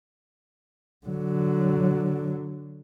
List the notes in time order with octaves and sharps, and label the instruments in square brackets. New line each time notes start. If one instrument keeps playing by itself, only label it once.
[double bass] D3 F#3